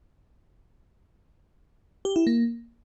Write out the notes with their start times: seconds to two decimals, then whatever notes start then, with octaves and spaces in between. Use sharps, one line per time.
2.05 G4
2.16 E4
2.27 A#3